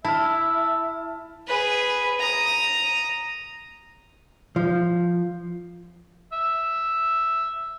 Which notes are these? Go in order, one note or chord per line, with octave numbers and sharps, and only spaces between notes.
E4 E5 A5 F6
G#4 B4
A#5 D#6
F3
E5